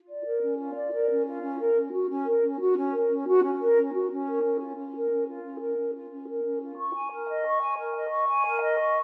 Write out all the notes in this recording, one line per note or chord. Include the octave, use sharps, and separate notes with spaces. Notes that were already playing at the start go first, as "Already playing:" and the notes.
Already playing: F4
D5
A#4
C#4
F4
D5
A#4
C#4
F4
C#4
A#4
C#4
F#4
C#4
A#4
C#4
F#4
C#4
A#4
C#4
F#4
C#4
A#4
C#4
F#4
C#4
A#4
C#4
F4
C#4
A#4
C#4
F4
C#4
A#4
C#4
F4
C#4
A#4
C#4
F4
C#6
G#5
A#4
D#5
C#6
G#5
A#4
D#5
C#6
G#5
A#4
D#5
C#6